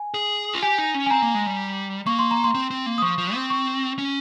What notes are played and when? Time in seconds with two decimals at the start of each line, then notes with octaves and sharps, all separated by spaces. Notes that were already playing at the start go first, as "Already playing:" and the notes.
Already playing: G#5
0.14 G#4
0.55 F4
0.62 G4 G#5
0.78 D#4
0.94 C#4
1.06 G#5
1.10 C4 A#5
1.22 A#3
1.34 G#3
1.46 G3
2.06 A#3 C#6
2.19 C6
2.31 A#5
2.44 C6
2.54 C4
2.71 C4
2.86 A#3
2.98 D#6
3.02 F3 C#6
3.18 F3
3.34 C4
3.50 C#6
3.98 C#4